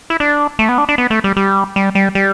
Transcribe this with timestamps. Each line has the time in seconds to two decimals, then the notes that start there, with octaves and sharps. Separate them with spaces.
0.10 E4
0.20 D4
0.59 A3
0.69 B3
0.78 D4
0.89 D4
0.98 B3
1.10 A3
1.24 G3
1.37 G3
1.76 G3
1.95 G3
2.15 G3